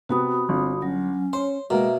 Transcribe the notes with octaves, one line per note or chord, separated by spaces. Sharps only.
C3 B3 F#4 B5 D#6
G1 C4
F#3 C#4
C5 C#5 C6
B2 G#3 A#3 A#4 E5